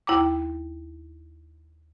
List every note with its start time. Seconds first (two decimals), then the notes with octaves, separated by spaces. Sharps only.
0.07 D#2 E4 G5 A#5 D6